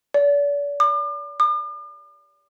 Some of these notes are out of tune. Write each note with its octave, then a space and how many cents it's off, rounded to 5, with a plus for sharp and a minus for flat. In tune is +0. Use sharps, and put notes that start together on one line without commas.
D5 -40
D6 +40
D6 +45